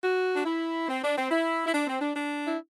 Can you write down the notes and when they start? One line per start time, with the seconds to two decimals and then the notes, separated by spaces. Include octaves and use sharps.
0.03 F#4
0.35 D4
0.45 E4
0.88 C4
1.02 D4
1.16 C4
1.31 E4
1.67 E4
1.73 D4
1.87 C4
2.01 D4
2.16 D4
2.48 E4